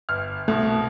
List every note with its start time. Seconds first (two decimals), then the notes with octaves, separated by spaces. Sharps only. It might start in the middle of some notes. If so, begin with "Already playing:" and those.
0.09 G1 F6
0.48 C2 B2 A3